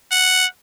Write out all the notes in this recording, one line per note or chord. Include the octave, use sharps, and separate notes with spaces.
F#5